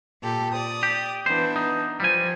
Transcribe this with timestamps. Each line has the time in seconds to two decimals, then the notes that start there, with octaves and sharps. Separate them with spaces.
0.22 A#2 G4 A4
0.53 D5 D#6
0.83 G4
1.26 E3 B3 D4 C5
1.56 D#4
2.00 F3 G3 G#5